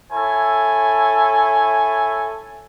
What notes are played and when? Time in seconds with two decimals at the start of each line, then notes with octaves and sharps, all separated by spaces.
0.12 E4 A4 C#5 G#5